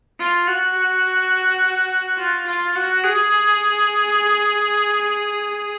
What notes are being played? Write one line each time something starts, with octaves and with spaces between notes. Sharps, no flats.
F4
F#4
F4
F4
F#4
G#4